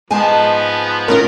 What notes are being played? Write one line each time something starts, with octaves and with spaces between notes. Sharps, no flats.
G#2 F3 B3 G#5 A5
A2 D#3 C#4 F4 A#4